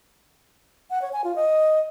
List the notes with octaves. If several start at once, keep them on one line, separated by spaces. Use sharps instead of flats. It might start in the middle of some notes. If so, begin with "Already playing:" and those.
F#5
C#5
G#5
F4
D#5